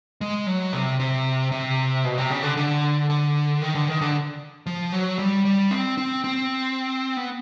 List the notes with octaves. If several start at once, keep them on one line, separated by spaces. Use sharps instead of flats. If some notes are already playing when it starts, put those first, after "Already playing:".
G#3
F#3
C3
C3
C3
B2
C3
C#3
D3
D3
D3
D#3
D3
D#3
D3
F3
F#3
G3
G3
C4
C4
C4
B3